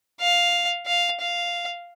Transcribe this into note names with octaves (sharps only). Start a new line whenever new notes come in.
F5
F5
F5